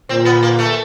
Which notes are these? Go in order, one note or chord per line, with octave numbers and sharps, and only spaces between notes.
A#2 C4
B3
A#3
A3